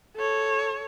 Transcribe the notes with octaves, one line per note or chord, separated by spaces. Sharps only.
A4 C#5